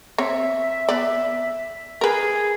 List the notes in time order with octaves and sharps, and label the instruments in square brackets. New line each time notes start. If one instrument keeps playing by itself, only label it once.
[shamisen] C4 C#5 [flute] E5
[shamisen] B3 D5
[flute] G#4 [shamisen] A#4 B4